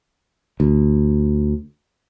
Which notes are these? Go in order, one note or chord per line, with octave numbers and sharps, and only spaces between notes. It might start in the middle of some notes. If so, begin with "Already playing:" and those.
D2